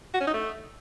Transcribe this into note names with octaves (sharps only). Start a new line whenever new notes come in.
F#4
C#4
D#4
A3